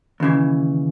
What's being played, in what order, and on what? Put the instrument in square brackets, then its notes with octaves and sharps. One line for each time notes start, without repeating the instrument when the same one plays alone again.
[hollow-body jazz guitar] D#2 C#3 E3